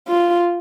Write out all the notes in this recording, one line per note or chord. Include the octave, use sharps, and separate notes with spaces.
F4